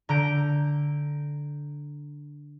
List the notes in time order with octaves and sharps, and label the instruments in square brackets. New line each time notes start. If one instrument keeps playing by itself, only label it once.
[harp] D3 A#5 G6 D7